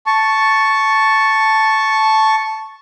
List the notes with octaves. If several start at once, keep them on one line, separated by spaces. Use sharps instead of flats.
A5 C#6